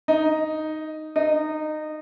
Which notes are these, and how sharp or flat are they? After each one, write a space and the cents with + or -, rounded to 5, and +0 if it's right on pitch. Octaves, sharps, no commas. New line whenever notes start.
D#4 +0
D#4 -20